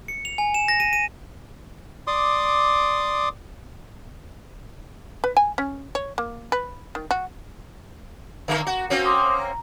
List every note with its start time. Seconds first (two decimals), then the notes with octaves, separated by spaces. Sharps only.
0.08 C#7
0.25 F7
0.38 G#5
0.54 E7
0.68 A#6
0.80 D#7
0.93 D#7
2.07 D5 C6 D6 D#6
5.24 B4
5.37 G#5
5.58 C#4
5.95 C#5
6.18 A#3
6.52 B4
6.95 D#3
7.11 F#4
8.48 D3 A#3 A#4
8.67 F#4
8.90 A#3 C4 C#4 F#4
9.05 C6 D6 D#6
9.39 A#5